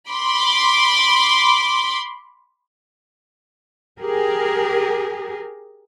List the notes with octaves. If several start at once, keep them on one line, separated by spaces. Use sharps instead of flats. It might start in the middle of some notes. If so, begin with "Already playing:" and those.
B5 C6 D6
G4 G#4 A#4